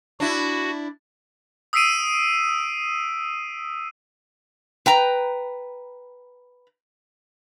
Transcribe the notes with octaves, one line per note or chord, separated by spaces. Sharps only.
D4 E4 F#4
D#6 E6 B6 C7 D7 D#7
B4 G5 A#5